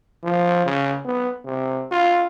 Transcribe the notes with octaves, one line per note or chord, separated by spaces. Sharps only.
F3
C#3
B3
C3
F4